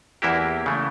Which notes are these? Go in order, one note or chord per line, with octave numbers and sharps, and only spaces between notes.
E2 E3 A#3 E4 G4
C#3 E3 A3